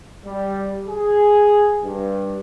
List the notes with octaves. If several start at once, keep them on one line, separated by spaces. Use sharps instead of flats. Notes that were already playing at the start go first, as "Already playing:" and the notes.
G3
G#4
G2